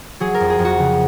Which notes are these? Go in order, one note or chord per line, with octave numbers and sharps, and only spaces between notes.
F#3 G#4
A#4
F2
G#4
F2
F#4
C#3